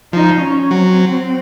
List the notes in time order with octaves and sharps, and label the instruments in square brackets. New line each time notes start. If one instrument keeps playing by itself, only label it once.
[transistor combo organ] F3 [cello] D#4
[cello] C#4
[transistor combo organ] F#3 [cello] C4